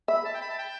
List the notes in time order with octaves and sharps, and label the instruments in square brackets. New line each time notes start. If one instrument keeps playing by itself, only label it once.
[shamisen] E5 [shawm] B5
[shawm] A5
G5
B5
A5
G5